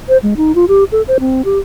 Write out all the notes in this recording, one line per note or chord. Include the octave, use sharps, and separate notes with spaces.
C5
G#3
D#4
F4
G4
A4
C5
C4
G4